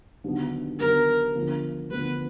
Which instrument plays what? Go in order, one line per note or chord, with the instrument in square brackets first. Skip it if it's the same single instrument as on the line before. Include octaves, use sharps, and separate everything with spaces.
[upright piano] D#2 D3 F#3 B3
[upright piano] D#2 D3 F#3 B3 [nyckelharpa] A#4
[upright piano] D2 D3 F3 B3
[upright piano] D2 D3 F3 B3 [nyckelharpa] B4